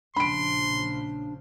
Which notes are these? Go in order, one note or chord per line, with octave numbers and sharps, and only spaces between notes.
A#1 C#3 F3 D4 B5 C6 D7